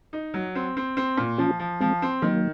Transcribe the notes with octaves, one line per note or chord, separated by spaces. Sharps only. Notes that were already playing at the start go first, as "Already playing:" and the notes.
D#4
F#3
C4
C4
C4
A#2
F3 C#4 F4
F3
F3 G#3 C4
C4
D#3 F#3 A#3